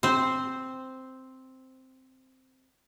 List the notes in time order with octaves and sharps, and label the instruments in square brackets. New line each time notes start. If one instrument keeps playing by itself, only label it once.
[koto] C4 C5